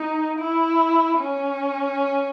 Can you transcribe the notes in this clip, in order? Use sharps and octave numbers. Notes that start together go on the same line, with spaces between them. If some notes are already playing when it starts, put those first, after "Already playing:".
Already playing: D#4
E4
C#4